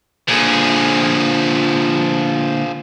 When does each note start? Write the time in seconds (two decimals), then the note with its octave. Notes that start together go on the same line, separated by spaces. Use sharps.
0.28 A#2 D3 F3 G#4